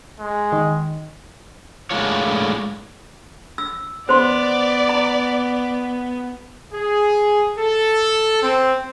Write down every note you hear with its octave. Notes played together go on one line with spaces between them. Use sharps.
G#3
D#3
A2 G#3 A#3 D4 F4 C#5
E6
B3 C5 D5 C6
A#5
G#4
A4
C4